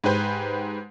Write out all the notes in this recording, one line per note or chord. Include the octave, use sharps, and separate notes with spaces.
G#2 G#3 G4 B4 C5 G6